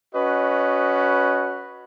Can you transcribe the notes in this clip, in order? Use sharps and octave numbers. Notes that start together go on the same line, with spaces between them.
C#4 F#4 B4 D#5